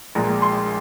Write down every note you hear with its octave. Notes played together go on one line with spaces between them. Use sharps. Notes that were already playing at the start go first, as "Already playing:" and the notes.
A#1 A#2 G#3 A#5
C6